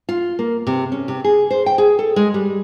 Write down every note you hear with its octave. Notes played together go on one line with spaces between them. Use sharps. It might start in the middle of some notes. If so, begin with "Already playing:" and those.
F4
A#3
C3
C#4
C3
G#4
C5
G5
G#4
A4
G#3
G3